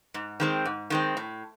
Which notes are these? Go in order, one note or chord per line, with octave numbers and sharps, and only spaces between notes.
G#2
D#3 G#3 C4
G#2
D#3 G#3 C4
A2